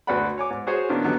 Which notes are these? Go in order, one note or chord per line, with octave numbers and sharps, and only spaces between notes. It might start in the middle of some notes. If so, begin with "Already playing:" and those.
D2 F#4 B4 D5 F#5 B5
C#5 G#5 D6
G#2
F#4 G#4 C5 C#5 G#5
A#2 D#3 A#3 B3 C#4 D4
D3 F#3 G3 A#3 B3 D#4